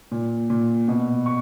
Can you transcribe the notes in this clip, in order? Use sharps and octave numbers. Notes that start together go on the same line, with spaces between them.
A#2
A#2
B2
C#6